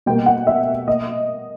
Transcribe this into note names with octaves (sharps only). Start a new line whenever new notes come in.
B2 G3 A#3 G5
F#5
E5
A#3 D#5